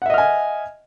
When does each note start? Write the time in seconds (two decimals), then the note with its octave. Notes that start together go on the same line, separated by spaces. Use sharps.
0.02 F#5
0.06 E5
0.10 D#5
0.14 F6
0.18 G#5